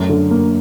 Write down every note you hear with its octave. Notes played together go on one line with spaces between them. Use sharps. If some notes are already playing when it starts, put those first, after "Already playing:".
Already playing: F#2 A3
D3
A#3